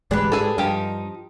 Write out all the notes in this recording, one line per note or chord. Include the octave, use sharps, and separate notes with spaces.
D1 A1 G#3 D4 G4 B4
G#2 G#4 A4
G2 F3 D#4 G4